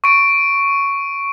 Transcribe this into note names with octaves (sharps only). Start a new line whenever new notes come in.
C#6 D7